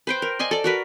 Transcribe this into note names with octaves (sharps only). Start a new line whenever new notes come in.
B4 C5 G5
A#4
D5 D#5 G#5 C6
A4 D5
F#4 A#4 B4